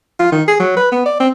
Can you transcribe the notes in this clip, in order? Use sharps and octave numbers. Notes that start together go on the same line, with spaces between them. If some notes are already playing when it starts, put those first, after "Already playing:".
F4
D#3
G#4
F#3
B4
B3
D5
C4